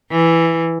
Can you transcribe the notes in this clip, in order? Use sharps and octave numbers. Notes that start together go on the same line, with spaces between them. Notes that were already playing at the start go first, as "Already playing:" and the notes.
E3